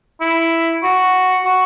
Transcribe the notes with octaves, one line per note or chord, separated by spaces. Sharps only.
E4
F#4
F#4